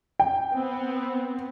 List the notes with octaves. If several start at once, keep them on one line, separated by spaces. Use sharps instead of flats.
G5
B3 C4